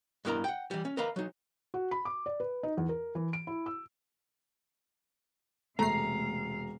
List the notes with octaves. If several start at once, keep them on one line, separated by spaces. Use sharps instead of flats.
G2 B3 E4 A#4 D#5 A#5
F#5 G5
E3 G3
C#4
A#4 B4 D#5 F5 A#5 B5
F#3 D#4
F#4
B5
D6
D5
B4
D#4
E2
A#4
E3
D7
E4
E6
E1 C3 A3 F5 A#5 C7